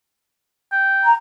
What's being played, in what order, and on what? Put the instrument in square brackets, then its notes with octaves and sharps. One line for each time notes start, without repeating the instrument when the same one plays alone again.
[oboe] G5
[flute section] A#5